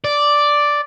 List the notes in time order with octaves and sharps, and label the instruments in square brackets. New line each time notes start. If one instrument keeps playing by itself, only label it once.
[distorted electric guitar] D5